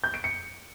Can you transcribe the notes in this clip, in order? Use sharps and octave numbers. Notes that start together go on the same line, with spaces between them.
G6
D7
C#7